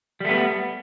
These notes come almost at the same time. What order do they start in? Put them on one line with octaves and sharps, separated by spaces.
G3 A3 B3